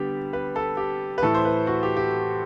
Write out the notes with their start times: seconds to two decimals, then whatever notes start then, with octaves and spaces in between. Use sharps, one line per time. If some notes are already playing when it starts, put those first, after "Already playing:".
Already playing: D3 G3 B3 G4
0.33 B4
0.56 A4
0.77 G4
1.18 B4
1.22 A2 E3 A3 A4
1.34 C5
1.45 B4
1.67 F#4
1.83 G4
1.97 G4